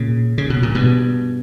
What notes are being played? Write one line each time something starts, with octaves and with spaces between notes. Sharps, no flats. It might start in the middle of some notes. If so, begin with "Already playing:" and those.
Already playing: A#2 C#3
C#3
B2
A#2
G2 B2